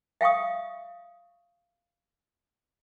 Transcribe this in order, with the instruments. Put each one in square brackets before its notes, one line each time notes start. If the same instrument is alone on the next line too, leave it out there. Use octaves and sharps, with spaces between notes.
[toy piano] E5 F5 G5 C#6 D#6